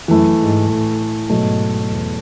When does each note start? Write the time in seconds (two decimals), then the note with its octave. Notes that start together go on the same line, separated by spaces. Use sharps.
0.08 F#2 E3 A3 E4
0.39 G#2
0.69 A2
1.29 G#2 B2 F#3 A3
1.90 E2